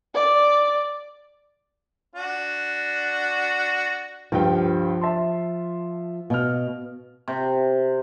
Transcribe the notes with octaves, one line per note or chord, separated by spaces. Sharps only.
D5
D4 F#4
C#2 G2 F3 G5
E5 A5 C6
B2 F5 F6
C3